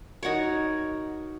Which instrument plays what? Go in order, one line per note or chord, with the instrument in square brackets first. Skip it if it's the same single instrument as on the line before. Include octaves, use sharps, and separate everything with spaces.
[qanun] D#4 F#4 A#4 C#5